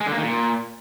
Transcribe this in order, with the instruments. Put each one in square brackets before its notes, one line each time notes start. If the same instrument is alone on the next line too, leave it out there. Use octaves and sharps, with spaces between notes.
[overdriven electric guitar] G#3
D3
A#3
D#3
A#2